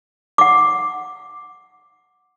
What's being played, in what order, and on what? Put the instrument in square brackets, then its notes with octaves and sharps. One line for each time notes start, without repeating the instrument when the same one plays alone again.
[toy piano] F#5 D6